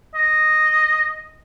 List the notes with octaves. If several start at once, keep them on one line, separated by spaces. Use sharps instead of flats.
D#5